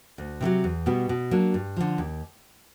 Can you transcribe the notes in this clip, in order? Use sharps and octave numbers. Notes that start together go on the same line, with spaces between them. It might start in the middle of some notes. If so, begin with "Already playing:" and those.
D2
C3 D#3 F#3
E2
B2 G3 B3
B2
F#3 A#3 D4
G2
D3 F3
D#2